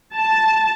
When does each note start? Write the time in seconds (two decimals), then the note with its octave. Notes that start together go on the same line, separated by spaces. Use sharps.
0.15 A5